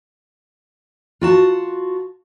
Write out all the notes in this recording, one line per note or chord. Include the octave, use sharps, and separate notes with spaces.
F4 F#4 A5